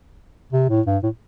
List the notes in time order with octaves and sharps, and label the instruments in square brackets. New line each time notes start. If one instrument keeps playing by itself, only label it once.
[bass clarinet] C3
A2
G2
A2